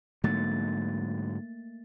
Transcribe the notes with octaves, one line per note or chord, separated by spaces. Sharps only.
G#2 D3 F#3 A3 A#3 A6